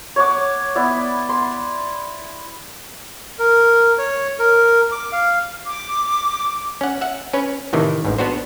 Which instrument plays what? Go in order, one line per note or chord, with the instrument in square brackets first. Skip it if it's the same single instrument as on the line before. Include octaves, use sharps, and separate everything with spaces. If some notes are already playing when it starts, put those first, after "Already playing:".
[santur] C#5 F#5 D6
B3 E4 D5
C6
[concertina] A#4
C#5
A#4
D6
F5
[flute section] D6
[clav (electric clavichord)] C#4 F#5
E5 F#5
C#4 B4 C#5
A2 C3 D#3 E3
A1 G#2
B3 D4 F#4 C5